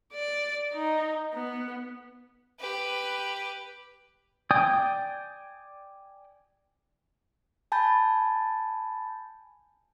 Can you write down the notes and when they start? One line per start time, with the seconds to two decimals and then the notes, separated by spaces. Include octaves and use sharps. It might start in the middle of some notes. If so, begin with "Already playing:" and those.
0.13 D5
0.74 D#4
1.34 B3
2.60 G4 B4
4.51 D5 G5 G#5 D#6
7.72 G#5 A5 B5 G6 A6